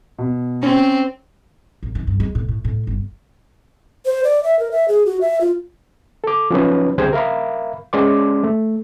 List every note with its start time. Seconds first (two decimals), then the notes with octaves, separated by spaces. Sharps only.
0.18 B2
0.63 C4 C#4
1.83 A1
1.95 D#3
2.07 G2
2.20 G#3
2.35 A2
2.49 A2
2.65 A2
2.87 G1
4.06 C5
4.24 D5
4.44 E5
4.59 A#4
4.71 E5
4.88 G#4
5.06 F#4
5.21 E5
5.41 F4
6.24 A4 D6
6.51 F3 F#3 C#4 D#4 B4 C#5
6.98 C2 D3 G4 G#4 C5 G#6
7.13 A#4 E5 F5 B5
7.93 G#3 C#4 D5 C6 D6
8.44 A3